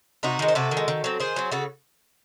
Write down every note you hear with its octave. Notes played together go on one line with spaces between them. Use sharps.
C3 D#4 F#4
D#3 G#3
C5
C3 F#4 A4
D#3
G#3
D#3
F#3 C4
D#3 G#4 C5
F#3 C4
C#3 F#4 A4